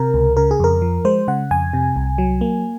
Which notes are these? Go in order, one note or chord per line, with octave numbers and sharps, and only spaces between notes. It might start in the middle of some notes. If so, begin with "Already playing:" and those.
Already playing: C3 A#4
C#2
C#3 A#4
G#4
F2 A#4
F3
G#3 C5
C#3 F#5
F2 G#5
C3
C2
F#3
A#3